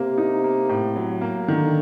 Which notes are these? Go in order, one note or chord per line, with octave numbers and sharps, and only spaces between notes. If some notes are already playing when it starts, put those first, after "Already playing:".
Already playing: C3 A#3
D#4
A#3
A2
F#3
A#3
D3 D#3